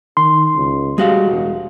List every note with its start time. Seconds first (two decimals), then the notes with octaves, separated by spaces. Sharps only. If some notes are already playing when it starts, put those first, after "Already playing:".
0.17 D#3 C6
0.55 C#2
0.98 G3 G#3 F#4 F5
1.30 E1